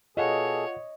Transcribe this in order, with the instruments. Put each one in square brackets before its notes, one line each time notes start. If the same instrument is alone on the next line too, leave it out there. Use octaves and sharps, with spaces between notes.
[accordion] B2 G#4 A4 [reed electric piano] F4 F5 F#5 [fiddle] C#5 [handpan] D#5